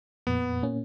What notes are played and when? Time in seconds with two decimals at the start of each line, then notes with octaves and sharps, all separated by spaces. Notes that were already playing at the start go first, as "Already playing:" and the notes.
0.27 F2 A#2 B3
0.63 A#2 A#3 C#4